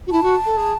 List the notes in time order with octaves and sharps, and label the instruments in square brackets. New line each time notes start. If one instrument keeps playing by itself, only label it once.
[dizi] F#4
[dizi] E4 [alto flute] A5
[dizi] F#4
A4
G#4